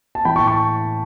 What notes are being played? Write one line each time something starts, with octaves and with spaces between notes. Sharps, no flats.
A5
E3 G5 B5
A5 C#6
A2
A5 C#6